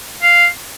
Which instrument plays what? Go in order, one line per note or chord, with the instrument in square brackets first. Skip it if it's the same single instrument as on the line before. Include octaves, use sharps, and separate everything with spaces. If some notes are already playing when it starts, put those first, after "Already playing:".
[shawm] F5